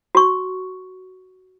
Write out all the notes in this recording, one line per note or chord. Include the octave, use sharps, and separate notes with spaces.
F#4 C#6